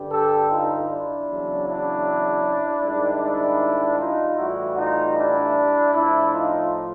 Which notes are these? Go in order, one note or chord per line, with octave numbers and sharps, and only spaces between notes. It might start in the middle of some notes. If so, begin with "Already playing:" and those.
Already playing: G2 D3 G3
G4 A4
D#4 F4
D4 E4
E2 C#3 F#3
D4 E4
G#2 D#3 G3
D4 E4
D#4 F4
A2 E3 G3 E4 F#4
D#4 F4
D4 E4
A2 F3 D4 E4
D#4 F4